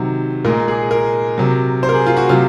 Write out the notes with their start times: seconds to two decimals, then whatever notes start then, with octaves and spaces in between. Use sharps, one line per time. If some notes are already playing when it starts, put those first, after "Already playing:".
Already playing: C3 D#3 F#3
0.45 A#2 G#3 A#4
0.68 G#4
0.91 A#4
1.38 C3 F#3
1.83 C5
1.89 A#4
1.94 G#4
2.06 F4
2.17 F#4
2.29 C3 F#3 F4